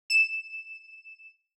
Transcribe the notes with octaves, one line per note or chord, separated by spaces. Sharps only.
E7